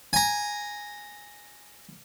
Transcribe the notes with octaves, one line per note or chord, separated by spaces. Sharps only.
G#5 A#5